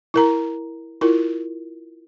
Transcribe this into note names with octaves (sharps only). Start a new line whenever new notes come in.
E4 A#4 A#5
E4 F4 A#4